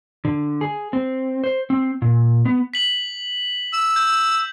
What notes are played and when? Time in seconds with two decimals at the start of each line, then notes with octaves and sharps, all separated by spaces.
0.25 D3
0.61 G#4
0.93 C4
1.44 C5
1.70 C4
2.02 A#2
2.45 B3
2.74 B6 F#7
3.73 E6
3.96 G6